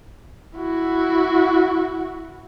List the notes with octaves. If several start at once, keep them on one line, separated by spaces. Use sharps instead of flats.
E4 F#4